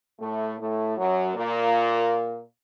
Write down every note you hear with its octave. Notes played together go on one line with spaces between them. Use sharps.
A2 A3
A2 A3
F#2 F#3
A#2 A#3